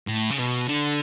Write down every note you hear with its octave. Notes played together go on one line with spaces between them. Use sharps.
A2
C#3
B2
D3